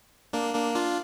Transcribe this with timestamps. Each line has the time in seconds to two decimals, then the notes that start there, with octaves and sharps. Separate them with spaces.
0.33 A#3 D4
0.54 A#3 D4
0.75 D4 F4